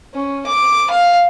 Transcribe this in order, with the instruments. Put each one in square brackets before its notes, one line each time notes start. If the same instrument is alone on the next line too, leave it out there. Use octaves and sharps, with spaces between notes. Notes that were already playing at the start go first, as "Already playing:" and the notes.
[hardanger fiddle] C#4
D6
F5